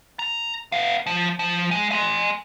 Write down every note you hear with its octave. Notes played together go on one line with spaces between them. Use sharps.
A#5
B3 F5
F3
F3
G#3
G#5 C6